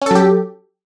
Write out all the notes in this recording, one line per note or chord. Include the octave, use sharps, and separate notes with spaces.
F#3 C#4 G4 A4